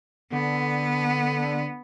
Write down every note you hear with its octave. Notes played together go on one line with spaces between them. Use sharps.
D3 B3